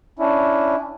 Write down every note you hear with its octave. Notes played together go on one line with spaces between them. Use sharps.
C#4 D4 E4